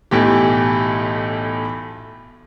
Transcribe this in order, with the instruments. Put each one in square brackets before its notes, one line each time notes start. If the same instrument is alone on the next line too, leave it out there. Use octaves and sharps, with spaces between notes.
[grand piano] B1 A2 E3 G4